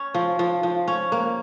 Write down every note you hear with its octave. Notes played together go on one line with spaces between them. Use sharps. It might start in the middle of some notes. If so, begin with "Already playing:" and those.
Already playing: C#4
F3
F3
F3
C#4
A#3